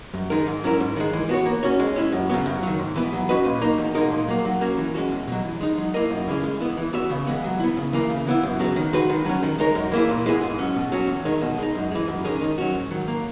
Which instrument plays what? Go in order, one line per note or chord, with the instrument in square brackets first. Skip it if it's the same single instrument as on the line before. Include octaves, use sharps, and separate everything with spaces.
[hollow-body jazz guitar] F#2
D#3 G#3 D#4 A#4
G#2
F#3 C#4 E4 A#4
G#2
D#3 G#3
E3
B3 F#4 C#5
A#3
C#4 F#4 C#5
G#3
C#4 E4
F#2
C#3 F#3 B3
F#2
D#3 F#3
G#2
E3 B3
F#3
C#4 F#4 B4 D#5
A#2
A#3 D#4
E2
B2 G#3 D#4 A#4
A#2
F#3 A#3
F#3
A#3 C#4 F#4
E3
G#3 C#4 F#4
E2
B2 F#3
E3
G#3 D#4
F#3
A#3 E4 A#4 D#5
F#2
C#3 E3 G#3 C#4
G#3
B3 E4
E3
B3 F#4 C#5 E5
C#3
E3 G#3 B3
F#3
B3 E4
C#3
E3 A#3
C#3
E3 B3 E4
F#2
C#3 F#3 B3 F#4
D#3
G#3 D#4 F#4 B4
D#3
F#3 C#4
D#3
G#3 D#4 A#4 C#5
F#2
E3 A#3 E4 G#4
A#2
G#3 B3 E4 G#4
G#2
F#3 C#4
B2
F#3 C#4 F#4
E2
D#3 G#3
B2
G#3 D#4
F#2
E3 G#3
F#2
D#3 G#3 C#4 G#4
D#3
F#3 C#4 F#4
G#2
D#3 F#3
A#3